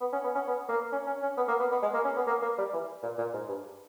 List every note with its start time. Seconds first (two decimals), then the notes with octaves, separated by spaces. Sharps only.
0.01 B3
0.13 C#4
0.24 B3
0.35 C#4
0.47 B3
0.69 A#3
0.92 C#4
1.07 C#4
1.22 C#4
1.37 B3
1.48 A#3
1.60 B3
1.72 B3
1.83 G#3
1.94 A#3
2.05 C#4
2.17 B3
2.27 A#3
2.42 A#3
2.58 G3
2.73 E3
3.03 A#2
3.18 A#2
3.34 G#2
3.48 G2